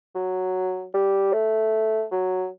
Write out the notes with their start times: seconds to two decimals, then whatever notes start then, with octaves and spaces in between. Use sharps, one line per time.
0.15 F#3
0.94 G3
1.33 A3
2.12 F#3